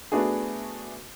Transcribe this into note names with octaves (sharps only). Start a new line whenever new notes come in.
A3 B3 D4 F#4 G#4